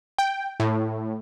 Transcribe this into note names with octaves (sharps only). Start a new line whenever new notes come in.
G5
A2